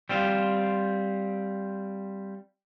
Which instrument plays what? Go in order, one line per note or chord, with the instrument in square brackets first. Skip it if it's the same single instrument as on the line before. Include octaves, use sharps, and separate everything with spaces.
[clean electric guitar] G3 C4 F4